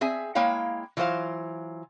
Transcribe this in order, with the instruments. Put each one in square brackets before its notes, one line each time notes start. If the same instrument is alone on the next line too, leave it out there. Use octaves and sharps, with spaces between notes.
[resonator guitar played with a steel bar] C4 G#4 E5 G#5
G#3 A#3 E4 C#5 F5 G5
E3 F#3 F4 C5 F5